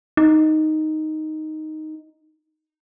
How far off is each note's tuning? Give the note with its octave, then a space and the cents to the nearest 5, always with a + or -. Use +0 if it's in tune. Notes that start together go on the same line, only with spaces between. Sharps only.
D#4 +0